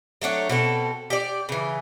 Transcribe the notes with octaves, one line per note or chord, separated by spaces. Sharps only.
F#3 A3 D4 C#5
B2 C4 A4
G4 D5
C#3 E3